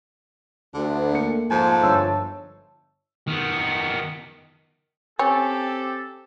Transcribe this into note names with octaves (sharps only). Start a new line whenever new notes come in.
D2 D3
A3 A#3 C#7
F2 G#2 F3 A5
G1 C#5 E6
D#3 B3
C4 C#4 G4 A4